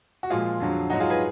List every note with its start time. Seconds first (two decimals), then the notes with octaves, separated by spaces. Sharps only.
0.23 F#4
0.30 A#2 F3 G#3 F4 G#4
0.60 F2 D3 F#3
0.90 G#2 F#3 D#4 F#4
1.00 F4 G#4
1.10 G#4 B4